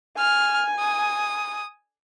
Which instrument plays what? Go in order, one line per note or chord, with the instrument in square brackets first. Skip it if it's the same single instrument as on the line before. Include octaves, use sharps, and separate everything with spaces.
[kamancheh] G#5 [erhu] F6
[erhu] D#6